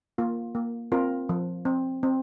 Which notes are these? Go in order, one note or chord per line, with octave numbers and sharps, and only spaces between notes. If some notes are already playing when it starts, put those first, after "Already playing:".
A#3 F4
A#3
C4 F4 A#4
F3
C4
C4